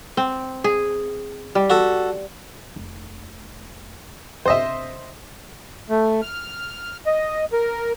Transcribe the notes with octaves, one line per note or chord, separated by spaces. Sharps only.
C4
G#4
G3
F#4 A4
F1
G1 C3 C5 D#5 E5
A3
F6
D#5
A#4